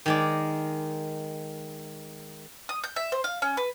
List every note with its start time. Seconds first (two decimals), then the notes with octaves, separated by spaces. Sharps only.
0.06 D#3 G#3 D5
2.69 D#6
2.84 G6
2.96 E5
3.12 C5
3.24 F5
3.42 C#4
3.57 B4